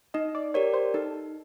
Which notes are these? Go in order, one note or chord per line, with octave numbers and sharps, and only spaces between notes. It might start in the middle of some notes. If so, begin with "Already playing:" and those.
D#4 D#5
D5
G4 A#4 C#5 D5
C5
D#4 A4